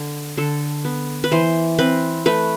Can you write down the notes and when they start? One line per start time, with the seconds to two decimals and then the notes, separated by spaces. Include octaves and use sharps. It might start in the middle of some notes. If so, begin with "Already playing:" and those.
Already playing: D3
0.37 D3 A4
0.85 B3
1.24 B4
1.31 E3 C5
1.79 C4 B4
2.26 A3 B4